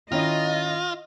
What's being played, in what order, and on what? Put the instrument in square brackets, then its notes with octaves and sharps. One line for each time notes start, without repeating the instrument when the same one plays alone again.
[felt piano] D#3 C#4 E4 [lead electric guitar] F4 [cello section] D#5